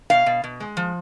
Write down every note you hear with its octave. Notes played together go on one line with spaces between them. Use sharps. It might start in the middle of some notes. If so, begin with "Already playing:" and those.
B2 F5
B2
B2
G#3
F3